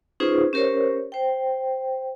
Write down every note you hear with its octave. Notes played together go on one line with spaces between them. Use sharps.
C#4 D#4 F4 G#4 B4 C5
C#4 G4 A#4 C5 C#5
C5 G5